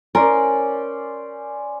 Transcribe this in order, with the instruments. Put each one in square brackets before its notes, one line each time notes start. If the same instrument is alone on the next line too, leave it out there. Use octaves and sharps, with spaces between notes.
[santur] C#4 C5 D5 [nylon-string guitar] A#4